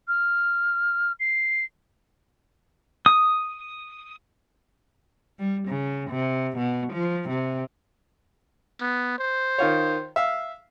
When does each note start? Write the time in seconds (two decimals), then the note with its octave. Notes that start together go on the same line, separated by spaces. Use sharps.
0.07 F6
1.19 C7
3.06 D#6
5.39 G3
5.68 C#3
6.10 C3
6.58 B2
6.93 F3
7.29 C3
8.81 B3
9.18 C5
9.58 D#3 F4 C#5
10.16 E5 F5